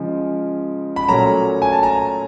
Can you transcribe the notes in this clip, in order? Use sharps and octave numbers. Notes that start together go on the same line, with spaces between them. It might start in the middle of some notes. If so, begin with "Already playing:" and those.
Already playing: C#3 F3 G#3
B5
A#2 F#3 A3 C#4 A#5
G#5
A5
A#5